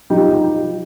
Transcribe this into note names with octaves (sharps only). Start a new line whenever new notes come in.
F3 D#4 G4
F3